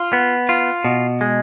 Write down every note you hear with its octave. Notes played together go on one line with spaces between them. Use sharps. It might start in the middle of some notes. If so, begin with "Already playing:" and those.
Already playing: F4
B3
F4
B2
G#3